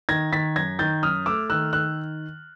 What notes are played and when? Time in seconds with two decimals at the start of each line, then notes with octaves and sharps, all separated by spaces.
0.09 D#3 G#6 A#6
0.33 D#3 A6 B6
0.56 F#2 G#6 A#6
0.79 D#3 G6 A6
1.02 F#2 D#6 F6
1.26 A3 D6 E6
1.50 D#3 E6 F#6
1.73 D#3 E6 F#6